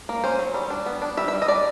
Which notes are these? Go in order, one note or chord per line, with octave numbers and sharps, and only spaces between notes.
A#3
C#4 C5
F#3
G3
D4
B3
D4
G3 E5
E5
G3
D#5
D4 D5